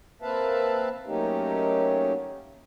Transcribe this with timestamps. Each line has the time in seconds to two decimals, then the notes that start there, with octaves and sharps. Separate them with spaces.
0.22 A#3 C4 B4 E5 F5 A5
1.07 F#3 A3 A#3 C#4 D#4 G4